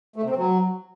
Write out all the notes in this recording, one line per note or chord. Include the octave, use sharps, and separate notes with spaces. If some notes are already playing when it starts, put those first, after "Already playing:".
A3
C3
C4
F#3